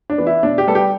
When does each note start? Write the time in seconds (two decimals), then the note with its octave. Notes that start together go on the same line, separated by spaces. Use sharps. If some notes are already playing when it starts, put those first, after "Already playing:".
0.10 D4
0.18 E3 B3
0.27 E4
0.43 B2 D4
0.58 G4
0.67 G3 B3 A4
0.75 G4